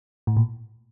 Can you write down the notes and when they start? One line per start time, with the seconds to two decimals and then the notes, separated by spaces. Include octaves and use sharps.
0.27 A2
0.37 A#2